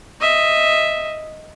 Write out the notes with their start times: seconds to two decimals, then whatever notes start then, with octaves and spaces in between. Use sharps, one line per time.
0.21 D#5 E5